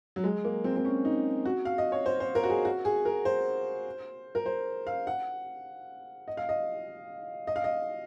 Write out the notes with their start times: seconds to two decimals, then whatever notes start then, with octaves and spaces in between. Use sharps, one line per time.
0.16 F#3
0.24 G#3
0.45 A#3
0.64 C4
0.76 C4
0.85 C#4
1.05 D#4
1.45 F#4
1.65 F5
1.78 D#5
1.92 C#5
2.06 C5
2.20 C5
2.35 A#4
2.43 F#4
2.50 G#4
2.65 F#4
2.85 G#4
3.05 A#4
3.25 C5
4.35 A#4
4.46 C5
4.87 F5
5.07 F#5
6.28 D#5
6.37 F5
6.49 D#5
7.47 D#5
7.56 F5
7.64 D#5